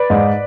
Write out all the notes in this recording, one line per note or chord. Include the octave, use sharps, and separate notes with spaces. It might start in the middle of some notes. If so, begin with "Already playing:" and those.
Already playing: B4 D5
G#2